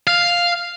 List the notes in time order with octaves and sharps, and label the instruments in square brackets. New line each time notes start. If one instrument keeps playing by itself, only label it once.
[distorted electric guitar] F5